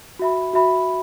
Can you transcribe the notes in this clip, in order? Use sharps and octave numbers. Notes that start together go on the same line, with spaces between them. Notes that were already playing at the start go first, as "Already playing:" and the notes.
F#4 E5 B5
F#4 E5 B5